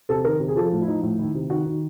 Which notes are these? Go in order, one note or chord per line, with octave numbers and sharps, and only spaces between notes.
C3 A4
D#3 A#4
C3
G#4
F3 A4
A2
E4
F3 D#4
A2
D#3 E4
C3
D#3 F#4
D#3